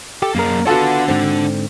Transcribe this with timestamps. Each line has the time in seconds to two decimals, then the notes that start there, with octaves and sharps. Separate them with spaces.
0.22 G4 A4
0.35 F#2 A#3 G#4 A#4
0.67 B3 D4 F4 F#4 A4 F#5
1.08 G#2 D3 C4